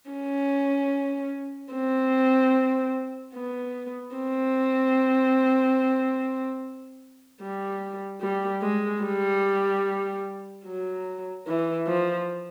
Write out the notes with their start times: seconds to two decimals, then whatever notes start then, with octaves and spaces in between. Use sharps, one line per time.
0.10 C#4
1.72 C4
3.34 B3
4.16 C4
7.41 G3
8.21 G3
8.62 G#3
9.02 G3
10.65 F#3
11.47 E3
11.87 F3